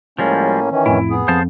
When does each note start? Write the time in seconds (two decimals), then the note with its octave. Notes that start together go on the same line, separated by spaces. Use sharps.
0.19 A2 F3 G3 G#3 A#3 C#4
0.71 D#3 E3 C#4
0.86 F2 A2 E4
1.10 B3 G#4
1.28 F2 C5 F5 A5